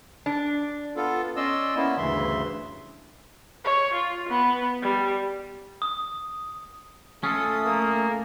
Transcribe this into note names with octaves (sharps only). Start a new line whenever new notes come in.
D4
B3 F4 A4
C#4 D5 D#5 C6 E6
A#3 B3 C#4 E4
D2 G2 C#3 E3 E5 C6
C#5
F4
B3
G3
D#6
A3 C#4 F4 A4 D#6
A#3